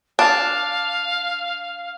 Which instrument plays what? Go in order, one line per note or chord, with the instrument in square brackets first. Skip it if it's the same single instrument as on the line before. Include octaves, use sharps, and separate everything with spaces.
[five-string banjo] D4 [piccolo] F5